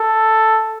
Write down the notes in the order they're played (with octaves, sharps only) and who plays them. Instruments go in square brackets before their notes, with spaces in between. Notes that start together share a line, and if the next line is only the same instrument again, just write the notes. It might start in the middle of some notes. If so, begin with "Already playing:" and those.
Already playing: [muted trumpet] A4